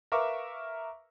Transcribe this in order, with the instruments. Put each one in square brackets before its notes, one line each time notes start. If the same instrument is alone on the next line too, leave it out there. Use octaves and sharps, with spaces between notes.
[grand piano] A#4 B4 E5 F5 C#6 D6